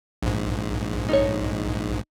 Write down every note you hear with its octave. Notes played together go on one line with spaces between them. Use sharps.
A#1 G#2
D#4 A4 C#5